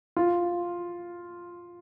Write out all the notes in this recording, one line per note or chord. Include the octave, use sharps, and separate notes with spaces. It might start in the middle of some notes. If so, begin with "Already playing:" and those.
F4